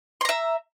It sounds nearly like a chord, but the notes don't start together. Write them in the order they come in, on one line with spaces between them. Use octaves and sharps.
C6 A#5 E5